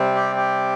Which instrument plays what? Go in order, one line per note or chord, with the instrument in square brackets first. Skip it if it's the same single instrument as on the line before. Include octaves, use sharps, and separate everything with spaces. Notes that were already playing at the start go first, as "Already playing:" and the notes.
Already playing: [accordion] C3 G3 C4
G4
G4